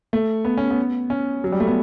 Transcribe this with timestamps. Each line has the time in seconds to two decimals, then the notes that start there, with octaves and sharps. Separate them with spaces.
0.13 A3
0.45 B3
0.57 C#4
0.71 B3
1.10 C#4
1.44 F#3
1.52 G3
1.60 A3
1.67 B3